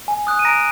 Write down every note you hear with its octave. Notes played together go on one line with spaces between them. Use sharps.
G#5
D#6 F#6
D#7
A#5 A#6 D7